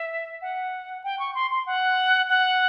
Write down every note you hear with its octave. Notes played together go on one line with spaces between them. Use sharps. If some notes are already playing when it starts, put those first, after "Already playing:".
Already playing: E5
F#5
G5
C#6
C6
C6
F#5
F#5